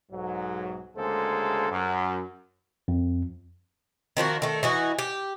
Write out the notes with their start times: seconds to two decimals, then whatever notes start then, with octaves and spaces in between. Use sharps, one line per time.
0.11 B1 G#2 F#3
0.96 D2 C#3 G#3 A#3 A4 C5
1.70 F#2
2.88 F2
4.17 D#3 F3 A#3 F#4
4.42 D#3 A3
4.63 E3 D#4 F#4
4.99 G4